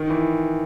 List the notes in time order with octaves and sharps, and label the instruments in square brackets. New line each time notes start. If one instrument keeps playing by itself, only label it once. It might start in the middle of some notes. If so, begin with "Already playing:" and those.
Already playing: [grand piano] D#3
E3